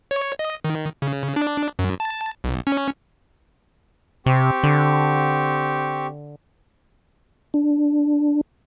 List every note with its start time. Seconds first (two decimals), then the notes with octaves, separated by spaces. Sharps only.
0.11 C#5
0.39 D#5
0.64 D#3
1.02 C#3
1.36 D4
1.79 F#2
2.00 A5
2.44 B1
2.67 C#4
4.26 C3 C4 G4 C#6
4.63 D3
7.54 D4